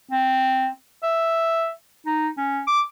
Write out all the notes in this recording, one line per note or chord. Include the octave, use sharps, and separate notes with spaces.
C4
E5
D#4
C#4
D6